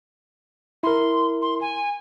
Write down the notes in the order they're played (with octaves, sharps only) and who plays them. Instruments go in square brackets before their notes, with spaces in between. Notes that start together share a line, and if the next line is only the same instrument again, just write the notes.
[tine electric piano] E4 A#4 [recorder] C6
[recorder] C6
G#5